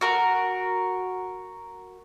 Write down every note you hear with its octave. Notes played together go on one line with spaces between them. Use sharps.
F#4 A#4